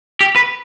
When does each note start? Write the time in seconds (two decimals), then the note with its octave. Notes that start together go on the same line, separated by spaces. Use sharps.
0.21 G4
0.36 B4